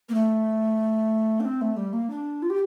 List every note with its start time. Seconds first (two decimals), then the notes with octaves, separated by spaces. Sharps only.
0.09 A#3
0.14 A3
1.40 D4
1.45 C4
1.61 A3
1.76 G3
1.93 A#3
2.10 D4
2.42 F4
2.50 G4